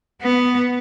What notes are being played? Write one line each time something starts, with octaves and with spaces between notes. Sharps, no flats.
B3